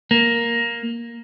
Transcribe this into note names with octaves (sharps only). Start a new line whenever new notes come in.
A#3